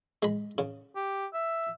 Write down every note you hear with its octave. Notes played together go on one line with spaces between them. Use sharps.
G#3 B5
C#3
G4
E5